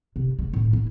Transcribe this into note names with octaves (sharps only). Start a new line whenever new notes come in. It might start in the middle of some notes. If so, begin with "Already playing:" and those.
C3
G#3
A2 A#3
E4